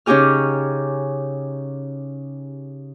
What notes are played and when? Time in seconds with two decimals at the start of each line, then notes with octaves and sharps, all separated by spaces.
0.06 C#3 C#4 D#4 G4 G#4 F6